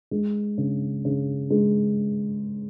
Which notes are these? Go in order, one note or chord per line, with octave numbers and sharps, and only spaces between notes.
G#3
C#3
C#3
G#3